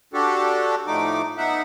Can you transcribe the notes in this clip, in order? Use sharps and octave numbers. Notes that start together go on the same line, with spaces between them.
D4 F#4 G4 A4
A2 F3 A3 D#4 D6
B3 D#4 E5 F#5